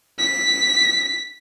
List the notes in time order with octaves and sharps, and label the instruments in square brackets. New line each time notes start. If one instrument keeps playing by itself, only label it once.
[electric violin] B6